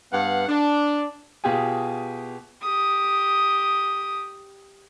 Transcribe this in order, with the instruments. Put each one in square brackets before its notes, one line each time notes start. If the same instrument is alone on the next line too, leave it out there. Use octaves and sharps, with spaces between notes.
[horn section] G2 B3 F5 F#5
D4
[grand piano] B2 F4 G4 G#4 G#5
[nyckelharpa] G4 D#6